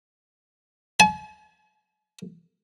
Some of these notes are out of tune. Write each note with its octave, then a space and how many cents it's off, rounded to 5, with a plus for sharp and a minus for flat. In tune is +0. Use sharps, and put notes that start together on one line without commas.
G#5 +45